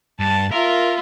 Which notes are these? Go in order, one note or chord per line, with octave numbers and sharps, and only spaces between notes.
G2 A5
F4 A#4 E5